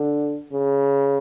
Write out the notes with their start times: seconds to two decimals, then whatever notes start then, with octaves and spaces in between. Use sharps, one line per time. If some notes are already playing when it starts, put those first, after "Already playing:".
Already playing: D3
0.53 C#3